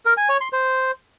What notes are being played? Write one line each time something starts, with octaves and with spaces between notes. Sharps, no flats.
A#4
G#5
C#5
C6
C5